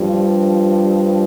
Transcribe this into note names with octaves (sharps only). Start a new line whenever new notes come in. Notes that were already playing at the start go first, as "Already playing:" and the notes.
Already playing: G2 F3